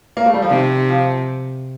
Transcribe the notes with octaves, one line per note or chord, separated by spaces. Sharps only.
A#3
A3
G3
F3
C3 D#3
F3